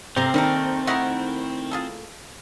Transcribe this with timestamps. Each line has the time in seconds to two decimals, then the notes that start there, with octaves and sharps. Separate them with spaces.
0.16 C3 A3 C4 A#4 F5
0.34 D#3 G3 A3 A#3 A4 A#4
0.87 A3 E4 A#4 D#5 E5 F#5
1.71 F4 G#4 A4